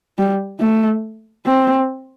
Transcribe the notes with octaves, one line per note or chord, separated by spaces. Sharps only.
G3
A3
C4